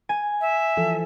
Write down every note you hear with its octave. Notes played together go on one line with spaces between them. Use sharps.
G#5
E5
E3 F3 A4